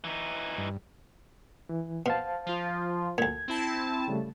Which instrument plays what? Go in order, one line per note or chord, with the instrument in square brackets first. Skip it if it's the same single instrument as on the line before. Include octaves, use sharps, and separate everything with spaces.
[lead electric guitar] E3 D#4
[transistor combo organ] G2
[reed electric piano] E3
[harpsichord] B2 [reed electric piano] C5 F5 A5
[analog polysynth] F3 F4
[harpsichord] D2 A#2 [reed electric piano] G#6
[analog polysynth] C4 E4 A5
[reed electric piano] C#3 G3 A3